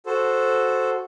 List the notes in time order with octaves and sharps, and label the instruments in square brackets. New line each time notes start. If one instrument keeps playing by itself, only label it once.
[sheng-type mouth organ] F#4 A4 C5